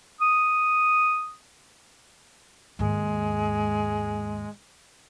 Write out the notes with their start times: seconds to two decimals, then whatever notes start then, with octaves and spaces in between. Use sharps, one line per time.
0.21 D#6
2.79 D#2 G#2 G#3